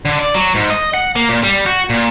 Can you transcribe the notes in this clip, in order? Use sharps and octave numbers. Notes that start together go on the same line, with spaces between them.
D3
D5
F#3
G#2
D#5
F#5
A#3
A#2
G3
F#4
A#2